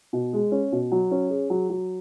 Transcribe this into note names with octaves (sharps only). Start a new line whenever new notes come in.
B2
G#3
C#4
B2
F#3
C#4
G#4
F#3
F#3